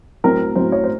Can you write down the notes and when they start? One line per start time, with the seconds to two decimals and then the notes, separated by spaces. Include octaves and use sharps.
0.24 A2 F#3 C4 A#4
0.56 A2 F#3 C4 C5
0.72 C#5
0.84 C5